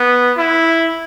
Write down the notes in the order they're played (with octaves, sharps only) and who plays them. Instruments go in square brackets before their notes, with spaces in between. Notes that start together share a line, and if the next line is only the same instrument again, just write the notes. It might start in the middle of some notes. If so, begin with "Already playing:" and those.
Already playing: [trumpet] B3
E4